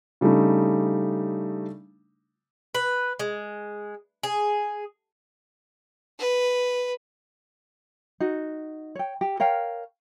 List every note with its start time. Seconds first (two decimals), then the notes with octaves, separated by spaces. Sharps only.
0.21 C#3 G3 A3 D4 D#4
2.75 B4
3.20 G#3
4.23 G#4
6.19 B4
8.20 D#4 F#4
8.95 C#5 G5
9.21 G4
9.40 A#4 C#5 F5 G5